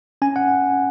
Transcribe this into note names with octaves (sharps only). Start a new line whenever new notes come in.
C#4 G#5
F#5